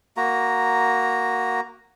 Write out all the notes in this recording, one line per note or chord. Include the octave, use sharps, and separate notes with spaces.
A#3 F#4 A#5